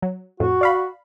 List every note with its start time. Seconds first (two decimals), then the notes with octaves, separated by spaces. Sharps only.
0.02 F#3
0.40 F2 A2 F#4
0.61 D5 F5 B5